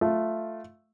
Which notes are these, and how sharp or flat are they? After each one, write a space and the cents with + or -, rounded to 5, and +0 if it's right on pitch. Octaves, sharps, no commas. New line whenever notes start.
A3 +0 F4 +0